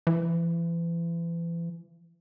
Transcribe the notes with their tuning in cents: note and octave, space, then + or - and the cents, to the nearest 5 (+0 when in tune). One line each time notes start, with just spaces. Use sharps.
E3 +35